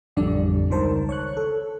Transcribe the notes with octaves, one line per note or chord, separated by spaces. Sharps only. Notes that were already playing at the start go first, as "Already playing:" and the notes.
A1 F2 D3 G3 D4 D5
C#2 D#3 A#4 C5 A5
C#5 C#6 F#6
A4